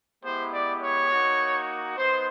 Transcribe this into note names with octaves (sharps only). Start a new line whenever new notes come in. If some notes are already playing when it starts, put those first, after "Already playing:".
G#3 B3 E4 G4 C5
D5
C#5
A#3 D#4 F#4
B3 D#4 C5